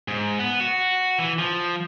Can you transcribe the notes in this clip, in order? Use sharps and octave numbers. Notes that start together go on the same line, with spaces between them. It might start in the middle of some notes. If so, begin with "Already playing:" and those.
G#2
B3
F#4
E3
F3